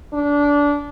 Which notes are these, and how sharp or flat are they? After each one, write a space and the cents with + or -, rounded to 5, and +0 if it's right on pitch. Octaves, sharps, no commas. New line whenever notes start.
D4 -20